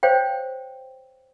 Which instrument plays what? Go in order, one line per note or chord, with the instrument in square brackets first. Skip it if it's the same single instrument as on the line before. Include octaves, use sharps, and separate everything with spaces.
[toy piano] C5 C#5 F5 G5